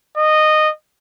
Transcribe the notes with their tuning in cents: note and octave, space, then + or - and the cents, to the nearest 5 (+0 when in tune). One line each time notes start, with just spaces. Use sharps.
D#5 -15